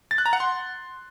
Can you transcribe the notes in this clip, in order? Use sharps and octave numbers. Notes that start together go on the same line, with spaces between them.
A6
F#6
A#5
F#5
C6